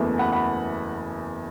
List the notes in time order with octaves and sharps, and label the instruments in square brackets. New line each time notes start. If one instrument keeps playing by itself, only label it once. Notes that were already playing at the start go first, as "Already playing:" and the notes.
Already playing: [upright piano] F#1 E2 E3 A3
F#5 B5
F#5 B5